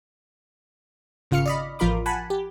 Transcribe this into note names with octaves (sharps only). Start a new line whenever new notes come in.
G#1 C#3 F4 F5 F6 C#7
D5 D#5 B5
A1 F3 F4 A#4 B5 D6
F#5 G#5 A5 B5
G4